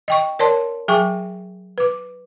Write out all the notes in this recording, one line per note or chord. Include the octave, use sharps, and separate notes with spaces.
D#5 G5 C#6
A#4 C#5 D5 A5 C6
F#3 G#4 G5 G#5 C#6 D6
B4 D6